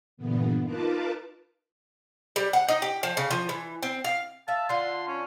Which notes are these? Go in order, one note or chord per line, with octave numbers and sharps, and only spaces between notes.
G2 A#2 D3 E3 B3
D#4 F4 A#4 B4 A5 D6
G3
F#5
D#4
G4
F3
C#3
F3
E3
C4
F5
E5 F5 A5
D3 F4 C6
C#4